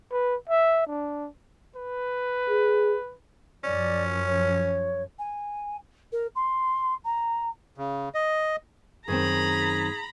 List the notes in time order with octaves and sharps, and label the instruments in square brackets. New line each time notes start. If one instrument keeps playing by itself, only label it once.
[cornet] B4
E5
D4
B4
[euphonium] G#4
[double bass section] F#2 F3 [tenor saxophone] C#4 [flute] D5
[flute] C#5
[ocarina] G#5
A#4
C6
A#5
[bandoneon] C#3
D#5
[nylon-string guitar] F#2 D#3 C4 [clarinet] G#4 [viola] A#5 B5